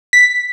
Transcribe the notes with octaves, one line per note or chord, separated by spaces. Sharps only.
B6